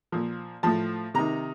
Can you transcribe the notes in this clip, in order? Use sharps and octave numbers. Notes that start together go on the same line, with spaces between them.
A#2 F3
A2 F3 A5
C3 D#3 A#5